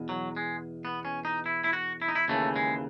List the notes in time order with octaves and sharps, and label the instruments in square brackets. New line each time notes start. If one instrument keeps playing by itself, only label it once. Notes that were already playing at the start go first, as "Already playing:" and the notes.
Already playing: [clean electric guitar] E2 B2
F#3
G#3
B3
C#4
D#4
E4
E4
F#4
E4
D#4
E4
D#2 C#3 E3 A3
G#3